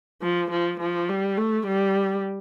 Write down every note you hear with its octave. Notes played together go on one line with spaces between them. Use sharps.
F3
F3
F3
G3
A3
G3